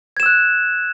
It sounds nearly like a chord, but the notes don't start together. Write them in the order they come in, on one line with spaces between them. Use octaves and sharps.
G#6 E7 E6 F#6